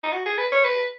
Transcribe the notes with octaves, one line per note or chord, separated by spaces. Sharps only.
D#4
F#4
G#4
B4
C#5
B4